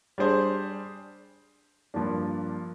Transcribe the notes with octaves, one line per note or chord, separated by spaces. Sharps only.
G3 D4 G#4 C5
G2 F3 A#3 D4